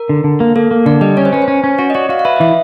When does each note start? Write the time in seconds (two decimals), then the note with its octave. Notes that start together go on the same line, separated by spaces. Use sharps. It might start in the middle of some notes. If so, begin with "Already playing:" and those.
Already playing: A#4
0.09 D3
0.24 D3
0.40 A#3
0.56 A#3 A4
0.71 A#3
0.86 D3 D5
1.01 G3 D#5
1.17 C#4 C#5
1.25 C5
1.33 C#4 B4
1.42 C5
1.48 C#4
1.64 C#4
1.78 F#4 C#5
1.90 D#5
1.95 F#4 D5
2.09 F#4 F5
2.19 F5
2.25 B4 E5
2.36 D#5
2.40 E3 E5